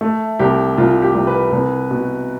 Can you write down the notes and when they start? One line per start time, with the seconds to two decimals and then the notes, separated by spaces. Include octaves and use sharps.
0.01 A3
0.39 C2 G4
0.77 C2 F4
1.02 G4
1.15 C2
1.27 B4
1.52 C2
1.91 B2